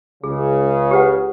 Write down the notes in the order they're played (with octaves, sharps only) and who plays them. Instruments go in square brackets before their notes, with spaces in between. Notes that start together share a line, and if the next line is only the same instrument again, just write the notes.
[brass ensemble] C#2 C#3 [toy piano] G#4
[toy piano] G4 B4 F#5